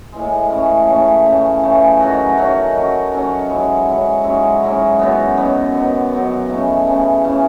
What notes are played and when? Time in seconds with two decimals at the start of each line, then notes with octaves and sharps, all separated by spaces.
0.12 A2 E3 G#3
0.50 C#3 E3 A3 C#4
0.87 C#3 E3 A3 C#4
1.25 C#3 E3 A3 C#4
1.62 C#3 E3 A3 C#4
2.00 D#3 F#3 C#4 F#4
2.37 D#3 F#3 C#4 F#4
2.74 D#3 F#3 C#4 F#4
3.12 D#3 F#3 C#4 F#4
3.49 G#2 F#3 C#4 E4
3.87 G#2 F#3 C#4 E4
4.24 G#2 F#3 C#4 E4
4.62 G#2 F#3 C#4 E4
4.99 F#2 D#3 F#3 B3
5.37 F#2 D#3 F#3 B3
5.74 F#2 D#3 F#3 B3
6.12 F#2 D#3 F#3 B3
6.49 C#3 E3 A3 C#4
6.87 C#3 E3 A3 C#4
7.24 C#3 E3 A3 C#4